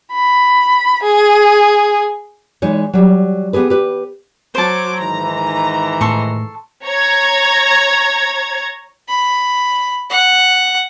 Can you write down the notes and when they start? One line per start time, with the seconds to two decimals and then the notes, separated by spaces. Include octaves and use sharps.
0.13 B5
1.03 G#4
2.62 E3 G#3 D#4 C#5
2.93 F#3 G3
3.53 B3 G4 G#4 B4
3.70 G4 B4
4.55 F#3 C5 A5 D6
4.99 G#2 D#3 E3 A#5
6.01 A2 A4 C6 C#6
6.85 C#5 A#5 G#6
9.08 B5
10.10 F#5